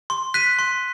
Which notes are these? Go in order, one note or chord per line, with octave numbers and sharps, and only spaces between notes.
C6
F#6 B6 D#7
C6